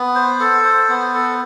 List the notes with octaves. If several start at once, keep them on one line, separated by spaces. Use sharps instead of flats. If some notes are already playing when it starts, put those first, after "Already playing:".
Already playing: B3
C5
A4
C5
B3
A4